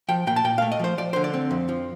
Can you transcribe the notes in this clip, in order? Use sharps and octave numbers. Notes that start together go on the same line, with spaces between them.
F3 G5
A#2 G5
A5
A#2 G5
A3 F5
D#5
F3 C5
F3 D5
D3 C5
D5
C4
F2
F3